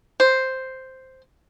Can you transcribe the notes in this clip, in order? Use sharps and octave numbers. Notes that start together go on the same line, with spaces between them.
C5